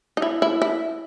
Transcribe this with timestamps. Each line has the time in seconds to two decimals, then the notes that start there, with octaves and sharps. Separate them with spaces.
0.17 D#4
0.22 E4
0.42 E4
0.62 E4